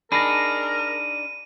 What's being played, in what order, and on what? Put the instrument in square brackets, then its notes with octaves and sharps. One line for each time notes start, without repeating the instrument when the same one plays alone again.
[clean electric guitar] D4 D#4 G#4 [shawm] A#4 [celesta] B5 A#6 [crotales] D#7